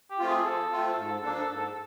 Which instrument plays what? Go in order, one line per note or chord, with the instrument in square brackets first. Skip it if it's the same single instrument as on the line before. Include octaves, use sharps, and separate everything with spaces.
[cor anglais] G4
[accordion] A3 C4 F4
[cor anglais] G#4
[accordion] F3 [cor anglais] A4
[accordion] A3 C4 F4
G#2
F3 A#3 D4
G#2